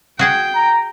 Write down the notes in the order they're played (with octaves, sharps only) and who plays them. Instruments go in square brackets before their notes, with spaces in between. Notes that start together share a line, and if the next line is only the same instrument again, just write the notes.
[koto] F#4 G#4 F#5 [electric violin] G5
[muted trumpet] A#5